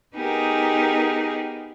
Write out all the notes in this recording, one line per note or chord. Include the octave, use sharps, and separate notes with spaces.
B3 D#4 G4 G#4 A#4